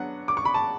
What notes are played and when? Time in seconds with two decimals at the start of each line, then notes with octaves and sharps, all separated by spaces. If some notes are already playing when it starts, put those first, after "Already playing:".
Already playing: F#3 B3 D4 F#5
0.28 D6
0.37 C#6
0.45 B5
0.54 A5